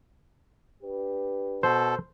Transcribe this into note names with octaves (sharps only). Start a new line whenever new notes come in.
D4 G4 B4
B2 A4 C5